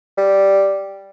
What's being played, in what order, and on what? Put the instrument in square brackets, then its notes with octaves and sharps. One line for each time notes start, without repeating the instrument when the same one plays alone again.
[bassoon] G3